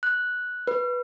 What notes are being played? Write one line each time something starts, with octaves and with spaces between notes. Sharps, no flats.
F#6
B4